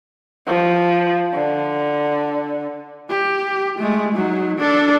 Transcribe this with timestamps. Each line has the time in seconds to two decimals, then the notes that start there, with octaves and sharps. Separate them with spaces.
0.47 F3
1.34 D3
3.09 G4
3.79 G#3 A3
4.15 F#3 D#4
4.58 D4 A4